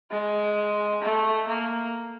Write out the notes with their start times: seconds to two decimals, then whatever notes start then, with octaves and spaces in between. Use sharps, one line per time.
0.11 G#3
1.02 A3
1.47 A#3